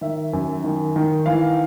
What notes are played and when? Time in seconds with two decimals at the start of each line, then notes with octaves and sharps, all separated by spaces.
0.01 D#3 E5
0.33 F#2
0.64 D#3
0.96 D#3
1.26 E3 F5